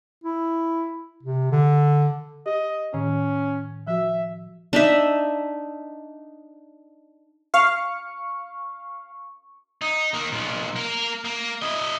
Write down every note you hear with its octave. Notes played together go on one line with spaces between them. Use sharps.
E4
C3
D3
G4 D#5
A2 D#3 C#4
F3 F#4 E5
D4 D#4 E5
F5 C#6
D#4
D#3 A#3
B1 A#2
A#3 A#4
A#3
E4 D#5